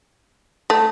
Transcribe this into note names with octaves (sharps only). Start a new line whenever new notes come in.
A3